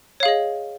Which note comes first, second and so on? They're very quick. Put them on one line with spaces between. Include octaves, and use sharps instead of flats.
C#5 F5 G#4 D#5